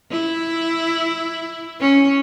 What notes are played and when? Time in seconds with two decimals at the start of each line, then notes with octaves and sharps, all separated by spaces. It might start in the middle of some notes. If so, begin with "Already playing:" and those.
0.10 E4
1.80 C#4